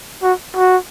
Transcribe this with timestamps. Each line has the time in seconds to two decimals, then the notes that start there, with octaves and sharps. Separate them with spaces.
0.23 F#4
0.57 F#4